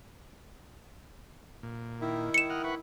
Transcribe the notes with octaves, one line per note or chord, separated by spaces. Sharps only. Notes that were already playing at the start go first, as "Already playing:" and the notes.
A#2
D#3 E4
C#7 E7
D#5 F#5 F6
B4 F#5 C#6